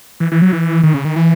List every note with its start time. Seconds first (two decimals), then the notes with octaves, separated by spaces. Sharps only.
0.20 E3
0.32 E3
0.42 F#3
0.53 E3
0.83 D#3
0.94 C#3
1.05 D#3
1.16 E3